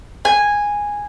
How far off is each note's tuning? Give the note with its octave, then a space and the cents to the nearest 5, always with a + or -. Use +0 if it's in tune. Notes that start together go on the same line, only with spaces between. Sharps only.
G#5 -10